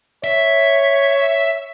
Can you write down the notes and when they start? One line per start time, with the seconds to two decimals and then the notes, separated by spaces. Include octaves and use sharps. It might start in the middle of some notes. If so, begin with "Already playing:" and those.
0.24 C#5 E5